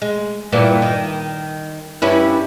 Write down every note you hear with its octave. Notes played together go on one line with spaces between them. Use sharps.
G#3
G2 A#2 E3
D#3
G2 C#4 E4